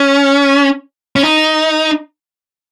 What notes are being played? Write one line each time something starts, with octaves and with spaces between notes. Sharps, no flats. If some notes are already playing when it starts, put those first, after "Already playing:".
Already playing: C#4
C#4
D#4